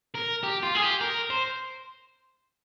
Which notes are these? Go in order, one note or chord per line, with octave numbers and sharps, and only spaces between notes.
A#4
G4
F4
G#4
G4
A#4
C5